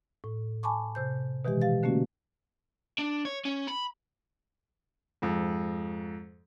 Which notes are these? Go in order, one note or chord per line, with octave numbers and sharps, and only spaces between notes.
A2
G#5 A5 B5 C#6 D6
C3 C5 G6
B2 D#3 E3 G#3 G4
G4 F5 A6
D3 A3 A#3 C#4 F#4
D4
C#5
C#4
B5
F2 G#2